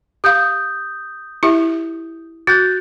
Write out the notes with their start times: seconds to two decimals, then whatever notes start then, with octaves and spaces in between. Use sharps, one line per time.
0.24 G4 F5 D#6 G6
1.43 E4 G4 E5
2.47 F#4 F#6 G6 A6